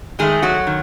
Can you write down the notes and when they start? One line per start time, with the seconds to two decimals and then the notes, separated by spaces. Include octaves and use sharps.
0.19 D#3 G#3 A3 G#4
0.42 F#3 F#4
0.67 D#3